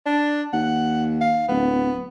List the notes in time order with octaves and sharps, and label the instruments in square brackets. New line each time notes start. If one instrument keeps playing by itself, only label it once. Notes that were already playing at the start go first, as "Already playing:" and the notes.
[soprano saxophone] D4
[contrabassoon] D#2 [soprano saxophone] F#5
[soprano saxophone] F5
[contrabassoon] D1 [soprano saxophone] B3